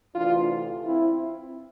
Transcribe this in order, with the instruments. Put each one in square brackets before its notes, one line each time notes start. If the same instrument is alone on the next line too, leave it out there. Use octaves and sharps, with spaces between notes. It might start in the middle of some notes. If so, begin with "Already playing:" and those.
[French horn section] D2 C3 E3 D4 F4
C4 E4